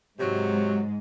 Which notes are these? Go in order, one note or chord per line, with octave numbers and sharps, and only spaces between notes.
G#2 C3 F#3 G#3